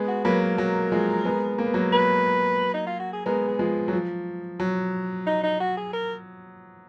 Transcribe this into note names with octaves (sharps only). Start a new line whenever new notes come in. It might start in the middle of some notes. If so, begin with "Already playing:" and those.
Already playing: G#3 B3
F#4
F#3 A#3 B4
A#4
F#3
F3 G#3
G#3 B3
A#3
B3
F#3 A#3
B4
D#4
F4
F#4
G#4
G#3 B3 A#4
G#4
F3 G#3
F#3
F3
F#3
D#4
D#4
F#4
G#4
A#4